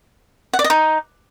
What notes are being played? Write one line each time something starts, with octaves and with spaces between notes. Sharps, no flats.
F#5
D5
D#5
D#4